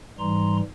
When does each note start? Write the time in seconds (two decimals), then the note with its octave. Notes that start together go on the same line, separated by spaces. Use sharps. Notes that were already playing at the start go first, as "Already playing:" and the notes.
0.19 G#2 E3 G3 A#5 C6